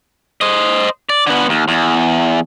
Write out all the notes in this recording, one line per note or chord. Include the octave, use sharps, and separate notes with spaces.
C5 D#5
D5
D3 B3
D#2
E2